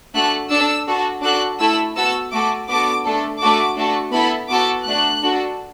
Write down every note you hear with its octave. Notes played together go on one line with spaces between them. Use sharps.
A3 D4 F#4 A4 F#6
D4 A4 E6
D4 F#4 A4
D4 F#4 A4 F#6
A3 E4 A4 E6
B3 F#4 A4 E6
A3 F#4 A4 D6
B3 D4 F#4 A4 D6
A3 D4 A4
A3 D4 F#4 A4 D6
A3 D4 F#4 A4
B3 E4 A4 B5
B3 F#4 A4 D6
A3 D4 F#4 F#6
D4 F#4 A4